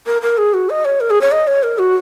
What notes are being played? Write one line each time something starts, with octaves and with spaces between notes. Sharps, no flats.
A#4
A#4
G#4
F#4
D#5
C#5
A#4
G#4
C#5
D#5
C#5
A#4
F#4